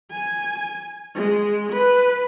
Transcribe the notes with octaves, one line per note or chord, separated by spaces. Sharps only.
G#5
G#3
B4